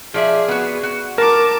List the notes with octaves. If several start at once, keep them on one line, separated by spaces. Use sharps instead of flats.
F3 G#4 D5 E5
B3 F#4
F#4
A#4 A5 D6